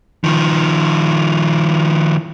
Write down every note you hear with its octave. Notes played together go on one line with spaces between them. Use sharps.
D#3 F3